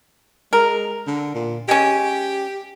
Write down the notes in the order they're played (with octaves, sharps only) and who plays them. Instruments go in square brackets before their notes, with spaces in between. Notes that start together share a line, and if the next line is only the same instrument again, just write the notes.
[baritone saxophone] G#3 [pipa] A#4
[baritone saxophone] D3
A#2
[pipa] G#3 C#4 [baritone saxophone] G4